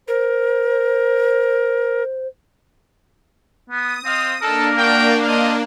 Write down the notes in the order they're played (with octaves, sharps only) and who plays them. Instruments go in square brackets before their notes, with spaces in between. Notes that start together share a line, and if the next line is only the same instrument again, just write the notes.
[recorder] A#4 [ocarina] C5
[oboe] B3 [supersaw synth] D#6
[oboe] C4 [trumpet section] C5 D#5 F5
[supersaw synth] A#3 D4 [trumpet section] D#4 A4 [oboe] A#4
[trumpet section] F#4 F5 G5
C5 D#5 F5